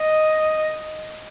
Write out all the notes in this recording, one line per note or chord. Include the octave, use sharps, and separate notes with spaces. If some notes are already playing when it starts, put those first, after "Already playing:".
Already playing: D#5